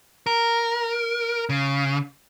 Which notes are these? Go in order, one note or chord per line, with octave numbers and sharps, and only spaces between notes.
A#4
C#3